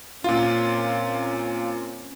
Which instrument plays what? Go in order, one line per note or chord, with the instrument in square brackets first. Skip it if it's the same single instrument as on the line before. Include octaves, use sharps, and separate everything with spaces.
[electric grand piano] A#2 F4 [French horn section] A#3 C4 C#4